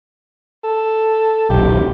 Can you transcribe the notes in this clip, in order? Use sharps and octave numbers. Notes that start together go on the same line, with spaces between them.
A4
D#1 B1 G4